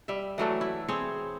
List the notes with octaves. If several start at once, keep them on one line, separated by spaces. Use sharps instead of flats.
G3 E5
E3 F#3 A3 D4
E4
C4 G#4 C5 C#5